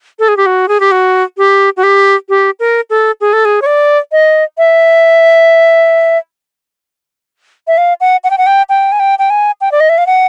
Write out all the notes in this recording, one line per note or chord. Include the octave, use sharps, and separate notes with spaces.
A4
G#4
G4
F#4
G#4
G4
F#4
G4
F#4
G4
G4
A#4
A4
G#4
A4
G#4
C#5
D5
D#5
E5
E5
F5
F#5
F#5
G5
F#5
G5
G5
G#5
G5
G5
G#5
G5
D5
D#5
E5
F5
F#5